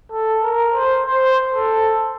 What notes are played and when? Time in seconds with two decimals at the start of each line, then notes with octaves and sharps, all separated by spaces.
0.11 A4
0.43 A#4
0.74 C5
1.06 C5
1.53 A4